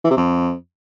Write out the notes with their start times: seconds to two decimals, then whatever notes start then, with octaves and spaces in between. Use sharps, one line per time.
0.05 E3
0.11 C3
0.17 F2